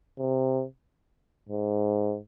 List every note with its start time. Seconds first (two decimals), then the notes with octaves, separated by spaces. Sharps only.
0.18 C3
1.49 G#2